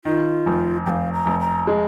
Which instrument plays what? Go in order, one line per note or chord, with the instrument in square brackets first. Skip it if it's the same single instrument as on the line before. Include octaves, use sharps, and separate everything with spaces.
[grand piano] D#3 [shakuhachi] F4
[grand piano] F1
[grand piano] F1 [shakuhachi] F5 G5
[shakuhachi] A#5
[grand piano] F1
[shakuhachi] A#5
[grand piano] G#3